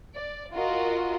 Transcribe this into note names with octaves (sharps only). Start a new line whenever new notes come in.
D5
F4 F#4 A#4 D#5